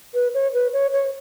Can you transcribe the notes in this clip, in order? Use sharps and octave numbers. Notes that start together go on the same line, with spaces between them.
B4
C#5
B4
C#5
C#5